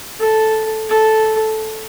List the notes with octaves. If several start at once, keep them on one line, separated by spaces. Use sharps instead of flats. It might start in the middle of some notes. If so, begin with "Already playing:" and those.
A4
A4